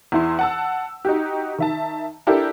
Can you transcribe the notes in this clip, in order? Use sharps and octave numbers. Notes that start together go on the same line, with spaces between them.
E2 E4 C6
F#5 A5 E6
D#4 F#4 G4
D#3 E5 A5
D4 E4 G4 A4 A#4